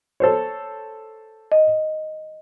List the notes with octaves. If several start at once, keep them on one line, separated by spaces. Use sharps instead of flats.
A4 C5 C#5
D#5